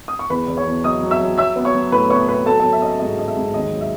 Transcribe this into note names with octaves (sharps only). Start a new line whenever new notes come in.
D#6
C#6
E2 B4 B5
E2
C#5 C#6
E2
F#3 D#5 D#6
F#3
E5 E6
F#3
F#3 E5 E6
B3
C#5 C#6
F#3
A2 B4 B5
B3 C#5 C#6
B3 B4 B5
F#3 A4 A5
F#3 A4 A5
E5
C#4 D#5 E5
G#2 D#5
C#4 D#5
E5
G#2
D#2 D#5
F#3
E5